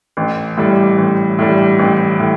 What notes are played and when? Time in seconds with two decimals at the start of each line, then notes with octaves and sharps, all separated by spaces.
0.17 A1
0.57 A2 G3
0.98 A1
1.39 A2 G3
1.79 A1
2.20 A2